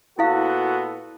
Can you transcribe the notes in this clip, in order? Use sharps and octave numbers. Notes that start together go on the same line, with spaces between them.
A#2 B3 E4 F#4 A4 F5